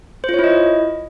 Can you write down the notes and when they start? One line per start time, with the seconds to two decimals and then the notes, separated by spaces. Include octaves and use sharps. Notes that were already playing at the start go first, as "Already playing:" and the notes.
0.24 C5
0.29 F4
0.34 C#5
0.39 E4
0.44 D#5